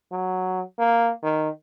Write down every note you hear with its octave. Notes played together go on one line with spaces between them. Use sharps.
F#3
A#3
D#3